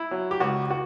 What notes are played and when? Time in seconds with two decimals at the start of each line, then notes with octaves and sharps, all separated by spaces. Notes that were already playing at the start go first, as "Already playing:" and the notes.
Already playing: E4
0.11 F#3
0.31 G4
0.40 C#2 F#4
0.71 F#4